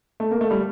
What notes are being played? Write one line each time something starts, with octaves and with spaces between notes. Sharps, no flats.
A3
A#3
A3
G3